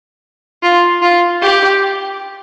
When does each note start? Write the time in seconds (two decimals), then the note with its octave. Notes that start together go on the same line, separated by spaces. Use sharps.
0.63 F4
1.02 F4
1.42 G4